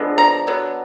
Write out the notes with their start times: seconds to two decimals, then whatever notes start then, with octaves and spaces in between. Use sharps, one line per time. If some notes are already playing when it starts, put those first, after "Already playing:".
Already playing: D3 F3 G#3 B3
0.18 A#5
0.47 D3 F#3 B3